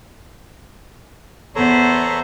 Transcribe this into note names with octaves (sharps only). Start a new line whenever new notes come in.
E2 B3 A4 C5 C#5 A#5